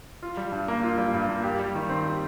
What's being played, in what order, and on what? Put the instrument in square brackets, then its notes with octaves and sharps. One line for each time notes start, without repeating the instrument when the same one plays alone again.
[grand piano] F4
G3
G2
A#3
F4
G3
G2
A#3
G4
G3
D#3
C4
G4